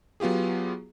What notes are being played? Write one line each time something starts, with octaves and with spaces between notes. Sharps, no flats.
F#3 B3 F4 G4 G#4